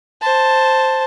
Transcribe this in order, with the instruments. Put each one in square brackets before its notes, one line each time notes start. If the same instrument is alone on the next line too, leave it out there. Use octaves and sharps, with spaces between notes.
[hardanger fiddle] C5 A5